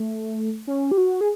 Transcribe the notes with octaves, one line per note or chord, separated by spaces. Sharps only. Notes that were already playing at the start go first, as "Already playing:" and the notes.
Already playing: A3
C#4
G4
F#4
G#4